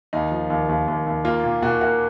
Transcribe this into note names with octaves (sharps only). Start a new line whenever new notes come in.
D#2 D#4
F3
D#2
D#2
D#2
D#2
A#3 F4
A#2
A#2 F#4
A#3 F#4